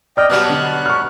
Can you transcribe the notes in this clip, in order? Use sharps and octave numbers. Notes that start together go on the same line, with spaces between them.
D5 D#5 G5 F6
B2 F#3 G3 B3 F#6
D3
C#6 F6